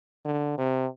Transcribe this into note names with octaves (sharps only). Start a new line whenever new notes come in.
D3
C3